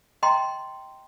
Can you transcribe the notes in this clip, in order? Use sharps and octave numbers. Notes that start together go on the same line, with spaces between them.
D#5 G5 A#5 C6